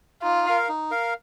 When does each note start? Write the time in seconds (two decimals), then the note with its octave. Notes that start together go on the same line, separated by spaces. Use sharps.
0.23 D#4 F4
0.46 A#4 F5
0.69 D#4
0.91 A#4 F5